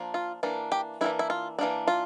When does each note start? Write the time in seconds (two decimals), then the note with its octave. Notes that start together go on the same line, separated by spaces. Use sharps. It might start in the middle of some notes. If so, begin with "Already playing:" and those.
Already playing: F3 A#3 D4
0.14 F4
0.43 E3 A#3 D4
0.72 G4
1.01 E3 G3 A#3 D4 E4
1.19 E4
1.30 F4
1.59 E3 A#3 D4
1.88 F4